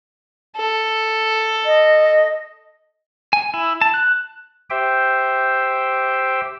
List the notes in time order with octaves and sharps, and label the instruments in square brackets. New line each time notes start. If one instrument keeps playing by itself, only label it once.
[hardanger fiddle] A4
[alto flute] D#5
[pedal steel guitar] G#5
E4
A5
F#6
[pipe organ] G4 C5 E5 G5